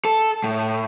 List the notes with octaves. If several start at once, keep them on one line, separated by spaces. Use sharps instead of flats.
A4
A2